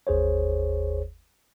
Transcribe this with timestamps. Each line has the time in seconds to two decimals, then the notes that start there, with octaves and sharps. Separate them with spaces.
0.07 G1 D#2 G#4 C5 C#5